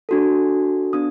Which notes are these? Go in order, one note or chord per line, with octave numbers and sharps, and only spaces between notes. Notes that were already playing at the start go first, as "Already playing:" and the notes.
D4 F#4 A4
B3 D4 D#6